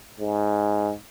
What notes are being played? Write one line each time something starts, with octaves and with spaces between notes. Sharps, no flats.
G#2